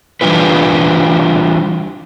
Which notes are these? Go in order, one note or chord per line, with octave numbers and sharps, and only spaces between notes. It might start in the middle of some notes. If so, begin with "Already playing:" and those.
E3 G3 D4 F4 B4